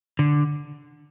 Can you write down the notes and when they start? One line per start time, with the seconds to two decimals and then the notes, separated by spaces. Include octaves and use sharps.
0.19 D3